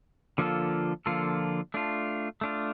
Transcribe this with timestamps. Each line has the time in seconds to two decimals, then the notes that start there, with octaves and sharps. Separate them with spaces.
0.38 D3 F3 A#3 F4 A4
1.06 D3 F3 A#3 F4 A4
1.74 A3 D4 F4
2.41 A3 D4 F4